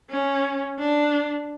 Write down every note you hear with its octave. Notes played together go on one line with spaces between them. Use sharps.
C#4
D4